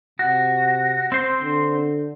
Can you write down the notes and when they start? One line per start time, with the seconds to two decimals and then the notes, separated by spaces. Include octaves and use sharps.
0.19 C3 F#4
1.12 C4 C5
1.42 D3